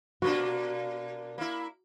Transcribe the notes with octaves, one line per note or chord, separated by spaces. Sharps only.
B2 A#3 D4 F#4
A#3 E4